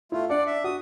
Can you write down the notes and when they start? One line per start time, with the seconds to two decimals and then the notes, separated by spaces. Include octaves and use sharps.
0.12 A3 E4 F4
0.30 D4 D5 F#5
0.47 E5
0.64 F#4 D#6